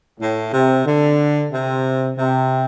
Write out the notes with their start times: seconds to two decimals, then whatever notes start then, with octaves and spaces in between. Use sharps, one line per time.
0.20 A2
0.53 C3
0.86 D3
1.52 C3
2.18 C3